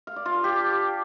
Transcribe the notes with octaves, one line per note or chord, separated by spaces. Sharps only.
F5
D5
F4
A4
G4